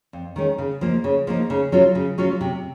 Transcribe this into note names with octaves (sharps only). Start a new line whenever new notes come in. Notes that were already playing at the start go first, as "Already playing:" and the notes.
F2
D#3 G#3 C#4
C#3
F3 A#3 D#4
C#3
F3 A#3 D#4
C#3
F#3 C#4 F4
C#3
F#3 C#4 F4
C3